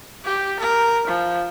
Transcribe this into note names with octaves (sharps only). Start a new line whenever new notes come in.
G4
A#4
F3